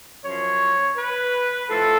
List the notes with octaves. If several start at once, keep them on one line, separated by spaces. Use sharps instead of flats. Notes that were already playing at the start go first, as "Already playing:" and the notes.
F#2 F3 C#5
B4
A2 F3 A4